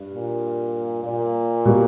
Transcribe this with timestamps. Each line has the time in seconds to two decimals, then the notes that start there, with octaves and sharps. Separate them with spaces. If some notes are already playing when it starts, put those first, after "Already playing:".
Already playing: G2
0.14 A#2
1.04 A#2
1.65 B2 G3 A#3